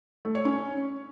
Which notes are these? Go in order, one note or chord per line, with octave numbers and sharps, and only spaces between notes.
A3
C#5
C#4